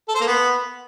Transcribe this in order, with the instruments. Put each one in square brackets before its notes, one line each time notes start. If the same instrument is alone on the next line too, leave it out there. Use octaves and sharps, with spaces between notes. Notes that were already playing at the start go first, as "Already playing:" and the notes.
[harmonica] A4
C5
A#3
B3